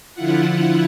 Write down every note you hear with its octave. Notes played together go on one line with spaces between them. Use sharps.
D3 F3 E4 F4 F#5